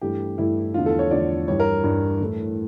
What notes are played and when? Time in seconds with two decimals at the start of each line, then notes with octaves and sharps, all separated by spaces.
0.01 G2 E3 A3 G4
0.38 G2 E3 A3 E4
0.74 E2 D3 F3 A3 F4
0.86 A4
0.99 C#5
1.11 E2 D3 F3 A3 D5
1.48 G2 E3 G3 C#5
1.60 A#4
1.84 G2 E3 G3
2.21 A2 E3 A3